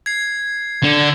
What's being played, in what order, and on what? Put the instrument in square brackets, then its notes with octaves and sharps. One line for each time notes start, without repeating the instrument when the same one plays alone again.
[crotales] G#6 C7
[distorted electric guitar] D3